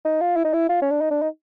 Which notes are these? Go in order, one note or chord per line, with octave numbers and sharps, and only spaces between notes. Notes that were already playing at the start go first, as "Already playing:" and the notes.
D#4
F4
E4
D#4
E4
F4
C#4
D4
D#4
D4
D#4